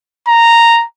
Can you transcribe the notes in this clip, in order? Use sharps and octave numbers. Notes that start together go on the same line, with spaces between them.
A#5